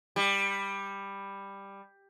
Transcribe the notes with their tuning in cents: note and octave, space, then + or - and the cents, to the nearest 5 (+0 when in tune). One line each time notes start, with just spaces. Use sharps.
G3 +10